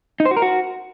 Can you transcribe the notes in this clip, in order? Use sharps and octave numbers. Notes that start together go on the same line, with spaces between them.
D#4
C5
F#4
A#4
F#4